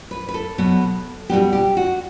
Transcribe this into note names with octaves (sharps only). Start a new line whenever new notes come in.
B4
B4
A4
B2 F#3 B3
B2 G3 B3 G4
G4
F#4